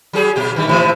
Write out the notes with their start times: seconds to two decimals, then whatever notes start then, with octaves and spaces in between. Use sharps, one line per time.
0.13 F#3 G4 G#4
0.36 A#2 G4
0.55 G2 D#3 G3
0.67 G#2 C3 E3